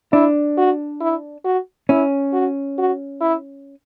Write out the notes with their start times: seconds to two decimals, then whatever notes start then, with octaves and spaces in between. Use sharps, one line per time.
0.12 D4 E4
0.57 F#4
1.01 E4
1.45 F#4
1.89 C#4 E4
2.33 F#4
2.78 F#4
3.21 E4